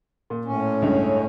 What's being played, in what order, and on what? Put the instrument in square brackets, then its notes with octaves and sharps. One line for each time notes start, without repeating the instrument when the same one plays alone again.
[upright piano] A#2
[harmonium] A2 C#4
[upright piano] C#2 G2 C#3